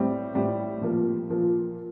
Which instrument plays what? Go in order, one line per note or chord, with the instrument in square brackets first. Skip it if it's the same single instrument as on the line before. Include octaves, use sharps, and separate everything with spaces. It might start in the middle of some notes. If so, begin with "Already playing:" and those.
Already playing: [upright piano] A2 G3 C4
A2 G3 C4
A#2 F3 A#3
A#2 F3 A#3